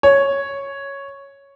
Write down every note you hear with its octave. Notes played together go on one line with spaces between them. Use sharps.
C#5